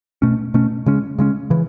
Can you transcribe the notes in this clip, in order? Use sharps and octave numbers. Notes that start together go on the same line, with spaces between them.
B2 A3 C#4
B2 A3 C#4
C#3 G#3 C#4
C#3 G#3 C#4
C#3 E3